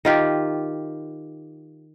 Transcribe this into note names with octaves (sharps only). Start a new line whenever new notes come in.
D#3 F4 G4